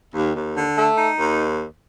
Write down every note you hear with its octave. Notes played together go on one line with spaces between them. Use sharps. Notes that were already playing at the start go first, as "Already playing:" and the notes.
D#2
D#2
D3
A3
D#4
D#2